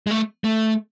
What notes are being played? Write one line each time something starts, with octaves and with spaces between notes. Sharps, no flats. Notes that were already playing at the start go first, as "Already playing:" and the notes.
G#3
A3
A3